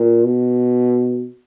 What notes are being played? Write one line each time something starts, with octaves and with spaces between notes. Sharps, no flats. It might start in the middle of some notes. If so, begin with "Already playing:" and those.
Already playing: A#2
B2